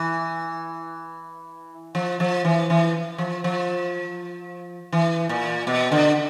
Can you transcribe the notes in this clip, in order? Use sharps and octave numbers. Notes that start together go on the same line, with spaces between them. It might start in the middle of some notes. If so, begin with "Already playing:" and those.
Already playing: E3
F3
F3
E3
E3
F3
F3
E3
A#2
B2
D3